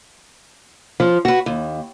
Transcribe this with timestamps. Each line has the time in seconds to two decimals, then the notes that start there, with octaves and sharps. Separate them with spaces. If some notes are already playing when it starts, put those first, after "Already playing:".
1.00 F3
1.25 F#4 B4
1.46 D#2